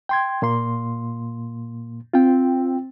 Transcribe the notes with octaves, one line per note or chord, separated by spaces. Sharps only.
G5 C6 G#6
A#2 A#3 C6
C4 F4 G5